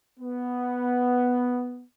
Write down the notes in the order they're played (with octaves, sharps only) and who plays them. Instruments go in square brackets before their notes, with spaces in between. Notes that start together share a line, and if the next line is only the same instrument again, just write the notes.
[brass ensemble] B3